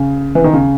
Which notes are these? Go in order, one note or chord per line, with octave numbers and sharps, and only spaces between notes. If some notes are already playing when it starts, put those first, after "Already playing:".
Already playing: C#3
E3
D#3
C#3